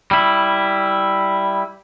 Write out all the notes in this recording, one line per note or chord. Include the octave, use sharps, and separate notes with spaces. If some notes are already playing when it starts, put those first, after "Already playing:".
G3 E4